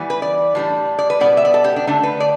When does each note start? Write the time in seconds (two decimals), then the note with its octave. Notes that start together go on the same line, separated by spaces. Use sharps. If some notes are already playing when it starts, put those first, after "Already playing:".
Already playing: E3 G3 B3
0.10 B4
0.22 D5
0.55 A2 G3 D4
0.99 D5
1.10 B4
1.20 B2 G3 B3 D5
1.37 E5
1.45 D5
1.54 A4
1.64 G4
1.76 D4
1.87 D3 A3 D4
2.03 B4
2.20 D5